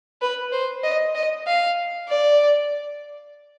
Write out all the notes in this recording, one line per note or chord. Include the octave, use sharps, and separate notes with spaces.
B4
C5
D#5
D#5
F5
D5